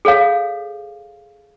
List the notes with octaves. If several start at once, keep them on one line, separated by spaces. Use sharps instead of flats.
G#4 A4 C#5 F5